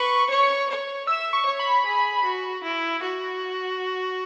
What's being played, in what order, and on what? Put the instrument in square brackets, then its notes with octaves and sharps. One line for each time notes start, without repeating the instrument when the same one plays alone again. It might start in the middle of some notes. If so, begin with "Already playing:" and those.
Already playing: [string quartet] B4 [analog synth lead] C#6
[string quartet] C#5
C#5
[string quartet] E5 [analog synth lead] E6
[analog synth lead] C#6
[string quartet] C#5
[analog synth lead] B5
[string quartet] G#4
F#4
E4
F#4